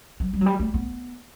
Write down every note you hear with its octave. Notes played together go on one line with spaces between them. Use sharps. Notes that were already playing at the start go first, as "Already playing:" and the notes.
F#3
G3
F#3
G3
A3
B3